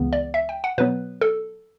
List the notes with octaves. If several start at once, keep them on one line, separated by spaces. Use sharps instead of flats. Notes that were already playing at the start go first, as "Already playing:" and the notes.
Already playing: C#2 C#3 E3 B3
D5
E5
G5
F#5
B2 F#3 B3 B4
A4